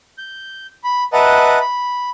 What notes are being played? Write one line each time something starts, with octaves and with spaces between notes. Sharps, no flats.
G6
B5
B4 D#5 E5 F#5 A5 A#5
B5